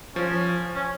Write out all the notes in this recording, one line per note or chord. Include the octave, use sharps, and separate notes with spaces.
F3 C#4
C#4